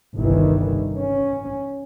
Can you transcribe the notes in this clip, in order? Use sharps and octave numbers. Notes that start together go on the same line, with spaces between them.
G1 C2 D#3 E3
C#4